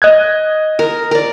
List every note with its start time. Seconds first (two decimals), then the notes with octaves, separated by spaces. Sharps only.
0.02 D#5 F#6 G#6
0.79 A#4
1.11 A#4 D5